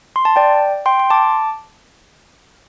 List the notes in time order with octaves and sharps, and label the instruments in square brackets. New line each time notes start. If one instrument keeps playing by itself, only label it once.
[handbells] C6
A5
D5 G5
G5 C6
C6
A5 D6